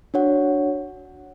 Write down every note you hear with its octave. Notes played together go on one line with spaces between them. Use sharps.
D4 F#4 C#5 F#5